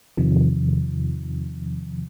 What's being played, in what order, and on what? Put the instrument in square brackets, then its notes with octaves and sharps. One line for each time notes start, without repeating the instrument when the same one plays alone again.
[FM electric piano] E2 C3 D#3 F3